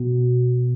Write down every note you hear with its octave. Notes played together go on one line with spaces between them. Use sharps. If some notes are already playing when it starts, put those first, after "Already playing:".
Already playing: B2 B3